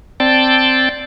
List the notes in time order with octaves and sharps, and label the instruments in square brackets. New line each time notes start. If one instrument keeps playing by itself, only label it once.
[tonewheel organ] C4 D5 G5 A5